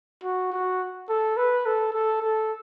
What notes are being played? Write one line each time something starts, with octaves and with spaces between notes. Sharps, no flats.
F#4
F#4
A4
B4
A4
A4
A4